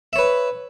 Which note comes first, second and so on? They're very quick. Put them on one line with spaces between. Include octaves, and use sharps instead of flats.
E5 C#5 B4